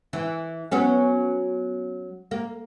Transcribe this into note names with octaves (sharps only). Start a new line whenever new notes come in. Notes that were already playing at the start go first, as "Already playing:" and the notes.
E3
F#3 B3 C#4
A#3